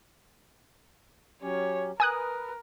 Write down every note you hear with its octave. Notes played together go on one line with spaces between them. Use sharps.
F#3 C#4 G4 C#5
A#4 B4 G#5 D#6 F#6